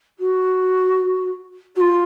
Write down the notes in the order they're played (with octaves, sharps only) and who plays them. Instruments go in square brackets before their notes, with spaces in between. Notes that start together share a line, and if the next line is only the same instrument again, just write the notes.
[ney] F#4
F#4
F4